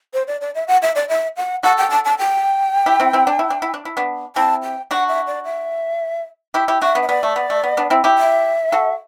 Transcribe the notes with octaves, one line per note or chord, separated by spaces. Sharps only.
C5
D5
D5
E5
F#5
E5
D5
E5
F#5
F#4 A4 F#5
G5
A5
A5
G5
E4 G4
C4 E4
C4 E4
D4
E4
D4
E4
D4
E4
B3 D4
C4 E4 A5
G5
D4 F#4 F#5
E5
D5
E5
E4 G4
E4 G4
D4 F#4 E5
B3 D4
E5
B3 D5
A3
B3
A3
B3
B3 D4
C4 E4
E4 G4
E5
F#4 A4